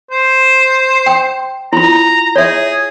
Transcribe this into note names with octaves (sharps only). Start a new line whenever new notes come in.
C5
G5
E4 F4 A#5
G#4 C#5 E5